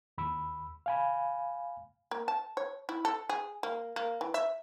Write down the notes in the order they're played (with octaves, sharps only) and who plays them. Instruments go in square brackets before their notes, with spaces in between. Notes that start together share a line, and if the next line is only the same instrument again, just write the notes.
[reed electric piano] D#2 B5 E6
F5 G#5 B5
[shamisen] A#3
A5
C#5
E4
A4
G#4
A#3
A#3
E3
E5